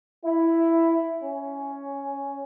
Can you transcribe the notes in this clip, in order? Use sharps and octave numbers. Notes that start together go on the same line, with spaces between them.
E4
C#4